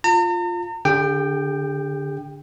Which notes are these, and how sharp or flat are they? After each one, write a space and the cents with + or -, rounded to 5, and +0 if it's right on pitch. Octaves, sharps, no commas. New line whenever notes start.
F4 +0 A#5 -45
D3 -10 G4 +40 G5 +0